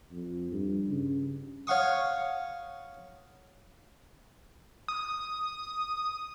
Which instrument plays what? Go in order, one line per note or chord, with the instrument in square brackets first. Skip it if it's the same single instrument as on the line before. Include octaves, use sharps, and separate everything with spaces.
[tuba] F2
G2
C#3
[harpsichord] C#5 F5 F#5 C#6 D#6
[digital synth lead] D#6